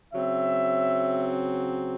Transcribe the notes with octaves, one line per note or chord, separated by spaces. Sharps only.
C#3 F#3 C4 E5